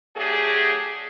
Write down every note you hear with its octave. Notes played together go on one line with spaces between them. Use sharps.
F#3 A3 D4 G4 G#4